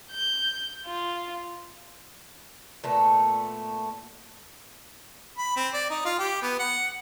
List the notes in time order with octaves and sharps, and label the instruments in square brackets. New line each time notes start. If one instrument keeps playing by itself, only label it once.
[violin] G6
F4
[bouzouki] A#2 A3 B3
[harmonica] B5
C4
D5
D#4
F4
G4
B3
F#5